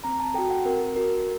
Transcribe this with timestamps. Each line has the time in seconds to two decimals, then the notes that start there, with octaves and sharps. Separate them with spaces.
0.04 C4 A#5
0.20 A5
0.34 F#4 A4 G5
0.50 F#5
0.65 C4 A#4
0.96 F#4 A4 A#4